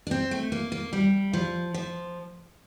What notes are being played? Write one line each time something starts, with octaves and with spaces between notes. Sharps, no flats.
D4
C4
A3
A#3
A#3
G3
F3
F3